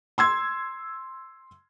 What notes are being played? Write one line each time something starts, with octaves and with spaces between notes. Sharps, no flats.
C6 E6 G#6